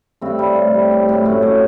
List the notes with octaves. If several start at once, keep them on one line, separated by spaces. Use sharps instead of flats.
G2 A3 C4
G2 G3
A2
G3
A2
A2
F#2 A3
F#2 A3